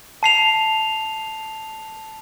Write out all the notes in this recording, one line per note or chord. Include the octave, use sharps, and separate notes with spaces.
A5 C7 F7